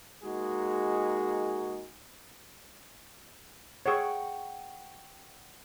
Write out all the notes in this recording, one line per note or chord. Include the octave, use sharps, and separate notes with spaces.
G#3 A#3 D#4 F#4 G#4
G#4 C#5 F#5 G5 C#6